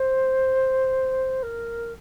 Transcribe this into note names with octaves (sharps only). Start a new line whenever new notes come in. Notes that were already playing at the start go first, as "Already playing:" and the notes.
Already playing: C5
A#4